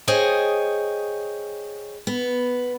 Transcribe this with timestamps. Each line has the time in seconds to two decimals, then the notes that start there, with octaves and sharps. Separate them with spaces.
0.08 G#4 C5 C#5 D#5 G5 G#5
2.07 B3